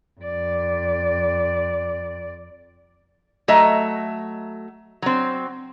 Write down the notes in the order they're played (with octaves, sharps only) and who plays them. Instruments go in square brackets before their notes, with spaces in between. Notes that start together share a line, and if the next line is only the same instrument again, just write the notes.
[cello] F2 D5
[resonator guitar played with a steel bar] F#3 A3 D#5 E5 A#5
F#3 C4